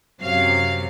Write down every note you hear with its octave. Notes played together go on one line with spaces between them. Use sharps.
F#2 C3 F#3 F5